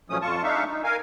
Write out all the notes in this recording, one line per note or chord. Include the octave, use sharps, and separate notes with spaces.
A#2 F3 F#3 A3 C#4 D#6
F2 F4 A5 C#6
G#3 D4 D#4 E5 F5 C#6
D#4
A#4 F5 G#5